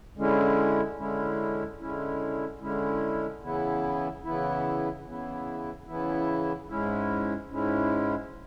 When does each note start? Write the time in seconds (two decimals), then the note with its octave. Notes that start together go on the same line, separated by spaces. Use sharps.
0.17 D3 G#3 C#4 E4
0.99 D3 G#3 C#4 E4
1.80 D3 G#3 C#4 E4
2.61 D3 G#3 C#4 E4
3.43 C#3 E3 B3 E4
4.24 C#3 E3 B3 E4
5.05 C#3 E3 B3 E4
5.86 C#3 E3 B3 E4
6.69 G#2 G#3 C#4 E4
7.50 G#2 G#3 C#4 E4